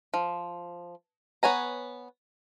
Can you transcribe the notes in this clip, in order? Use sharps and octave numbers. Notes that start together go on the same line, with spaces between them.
F3
B3 C#5 G#5 A#5